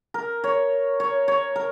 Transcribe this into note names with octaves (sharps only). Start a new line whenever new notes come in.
A#4
C#5
C#5
C#5
A#4